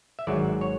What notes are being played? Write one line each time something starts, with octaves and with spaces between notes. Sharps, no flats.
E5
G#1 G#2 F#3 D5
C#5